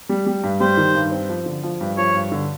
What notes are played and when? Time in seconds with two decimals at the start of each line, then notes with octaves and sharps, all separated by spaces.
0.09 G3
0.26 G3
0.43 G2
0.60 G3 C5
0.77 D#3
0.95 G2
1.11 C4
1.29 F3
1.46 D3
1.63 F3
1.81 G2
1.97 F3 C#5
2.14 G2
2.32 D3